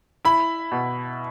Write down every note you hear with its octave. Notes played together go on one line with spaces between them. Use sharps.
E4 B5
B2